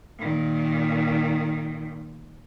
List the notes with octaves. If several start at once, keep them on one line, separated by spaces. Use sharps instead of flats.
A#2 D#3